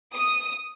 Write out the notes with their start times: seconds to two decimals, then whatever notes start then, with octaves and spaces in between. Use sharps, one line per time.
0.13 D#6